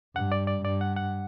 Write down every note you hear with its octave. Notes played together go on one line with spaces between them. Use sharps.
G2 F#5
D5
D5
G2 D5
F#5
F#5